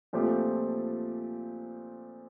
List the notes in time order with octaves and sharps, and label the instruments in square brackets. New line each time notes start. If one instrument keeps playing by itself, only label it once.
[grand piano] A#2 F3 A3 C4 G4